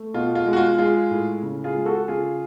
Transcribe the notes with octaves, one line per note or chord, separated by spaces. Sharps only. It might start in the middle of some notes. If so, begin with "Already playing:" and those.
Already playing: A3
B2 F4
F4
G#3
F#4
F4
G#3 F4 G#4
A2
C#3
F4 G#4
G#3
F#4 A4
C#3 F4 G#4